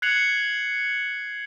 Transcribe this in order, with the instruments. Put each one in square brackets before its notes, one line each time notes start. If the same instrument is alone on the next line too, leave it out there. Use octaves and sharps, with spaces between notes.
[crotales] F#6 G#6 C7 C#7 F7 F#7